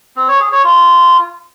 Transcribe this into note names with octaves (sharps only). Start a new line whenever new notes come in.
C4
C#5
G#4
C#5
F4